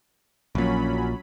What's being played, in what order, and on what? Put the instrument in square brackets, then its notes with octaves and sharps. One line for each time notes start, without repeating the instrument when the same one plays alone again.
[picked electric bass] A#1 A#2 [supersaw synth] F#3 C#4 B5